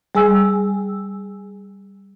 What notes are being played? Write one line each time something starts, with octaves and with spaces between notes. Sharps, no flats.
G3 G#4 G#5 E6